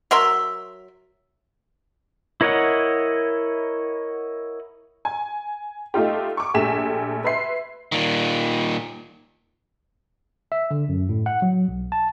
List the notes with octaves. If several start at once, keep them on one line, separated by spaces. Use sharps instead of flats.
F#3 A#4 E5 C6
E4 A#4 C#5 D#5 F#5
G#5
A3 D#4 F4 G4
C#6 D6
A#1 A3 G4 G#5 B6 E7
B4 E5 C6 C7
A#2 D#3
E5
D3
F#2
A2
F#5
F#3
B1
A5